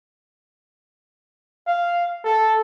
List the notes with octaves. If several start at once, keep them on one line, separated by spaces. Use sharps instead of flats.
F5
A4